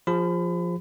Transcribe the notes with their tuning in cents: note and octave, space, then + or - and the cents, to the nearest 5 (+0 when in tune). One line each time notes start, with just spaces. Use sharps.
F3 +0 G#4 -35 B5 +30